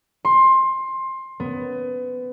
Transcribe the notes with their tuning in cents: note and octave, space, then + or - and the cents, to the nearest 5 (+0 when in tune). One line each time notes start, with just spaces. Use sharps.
C6 +20
B3 +25